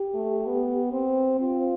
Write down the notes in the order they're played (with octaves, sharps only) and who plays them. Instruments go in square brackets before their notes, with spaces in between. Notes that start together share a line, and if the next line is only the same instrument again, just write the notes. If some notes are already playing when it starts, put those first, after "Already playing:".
Already playing: [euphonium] G4
[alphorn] A3
B3
C4
[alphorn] C4 [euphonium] F4